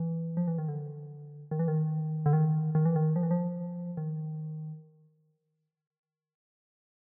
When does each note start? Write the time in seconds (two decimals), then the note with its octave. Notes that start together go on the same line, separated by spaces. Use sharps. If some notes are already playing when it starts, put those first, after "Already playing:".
Already playing: E3
0.37 F3
0.48 E3
0.58 D#3
0.68 D3
1.51 D#3
1.59 E3
1.68 D#3
2.26 D3
2.33 D#3
2.75 D#3
2.85 E3
2.96 D#3
3.16 F3
3.23 E3
3.31 F3
3.97 D#3